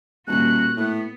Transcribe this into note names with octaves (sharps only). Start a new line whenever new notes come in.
D#1 A#2 F#4 F#6
A2 B3